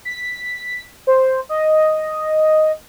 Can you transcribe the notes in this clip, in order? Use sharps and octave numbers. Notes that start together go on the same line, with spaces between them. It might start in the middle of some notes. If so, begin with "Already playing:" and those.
B6
C5
D#5